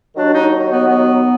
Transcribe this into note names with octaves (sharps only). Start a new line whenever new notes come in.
D#2 D#3 F#3 D4
D#4
B3
B3